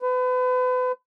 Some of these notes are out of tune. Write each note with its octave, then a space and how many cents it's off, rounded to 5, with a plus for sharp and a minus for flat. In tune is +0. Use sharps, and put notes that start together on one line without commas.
B4 +35